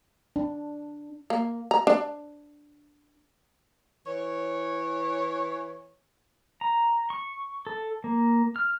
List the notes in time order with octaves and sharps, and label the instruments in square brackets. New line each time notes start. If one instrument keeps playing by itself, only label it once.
[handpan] D4
[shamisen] A#3
A#5
D4
[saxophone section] E3 C#5
[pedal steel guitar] A#5
C#6
A4
A#3
F6